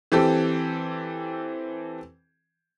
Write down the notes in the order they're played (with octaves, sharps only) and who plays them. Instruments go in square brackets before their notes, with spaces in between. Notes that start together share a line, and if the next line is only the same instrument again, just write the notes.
[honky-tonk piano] E3 C4 G4 A4